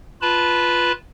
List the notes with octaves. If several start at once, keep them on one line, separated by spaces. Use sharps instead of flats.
F4 B4 A5 B5